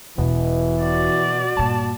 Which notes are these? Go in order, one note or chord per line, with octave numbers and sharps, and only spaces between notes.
E1 E2 B2 E3
F#4 D5
G2 A#2 A5